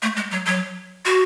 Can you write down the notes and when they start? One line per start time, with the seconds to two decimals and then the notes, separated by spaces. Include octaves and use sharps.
0.02 A3
0.16 G#3
0.31 F#3
0.46 F#3
1.05 F#4